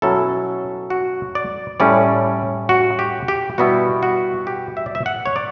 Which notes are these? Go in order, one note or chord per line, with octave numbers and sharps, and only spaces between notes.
B2 F#3 C#4 E4 A4
F#4
D5
A2 G3 C#4 D5
F#4
G4
G4
B2 G3 B3 E4 F#4
F#4
G4
E5
D5
E5
F#5
C#5
D5